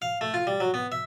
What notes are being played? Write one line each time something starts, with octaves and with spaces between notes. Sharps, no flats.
F5
A3
F4
G3
F#3
B3
E5